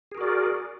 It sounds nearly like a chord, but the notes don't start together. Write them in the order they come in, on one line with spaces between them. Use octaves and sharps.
G#4 A#4 F#4 D5